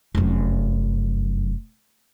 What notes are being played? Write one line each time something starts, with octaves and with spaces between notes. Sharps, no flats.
F1 F#2